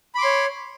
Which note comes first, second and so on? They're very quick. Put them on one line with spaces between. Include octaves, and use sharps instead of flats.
B5 D6 C6 C#5